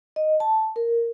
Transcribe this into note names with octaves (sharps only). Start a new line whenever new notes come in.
D#5
A5
A#4